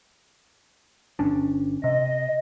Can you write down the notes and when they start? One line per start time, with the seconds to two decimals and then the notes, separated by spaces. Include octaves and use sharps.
1.19 G1 C#4 D4
1.84 C3 D#5